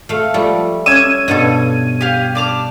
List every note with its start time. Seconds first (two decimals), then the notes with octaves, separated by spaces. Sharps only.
0.09 A3 F5
0.34 F3 G3 A3
0.86 C#4 C#6 D6 E6 G#6 D#7
1.28 G2 B2 A4
2.01 G4 F5
2.35 D4 D6 F6